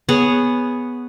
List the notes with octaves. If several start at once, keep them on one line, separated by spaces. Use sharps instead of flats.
B3 G#4 C#5 F#5